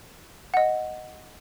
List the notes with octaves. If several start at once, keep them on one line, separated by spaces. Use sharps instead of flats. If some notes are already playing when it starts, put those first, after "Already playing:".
D#5 F#5